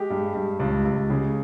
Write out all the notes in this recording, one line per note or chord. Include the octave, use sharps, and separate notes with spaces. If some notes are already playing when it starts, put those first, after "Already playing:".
Already playing: G#3 G4
G2
G2
C#2
C#2
C#3